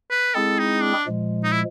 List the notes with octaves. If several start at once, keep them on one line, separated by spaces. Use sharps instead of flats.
B4
G#3 C4 E4 G#4 A4
D#4
D4
A#2 F3 G#3
D#4
E4